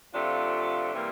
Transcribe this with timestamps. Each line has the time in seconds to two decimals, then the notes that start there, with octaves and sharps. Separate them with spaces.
0.14 C3 F3 A3 D4 F4
0.93 C3 E3 G3 A#3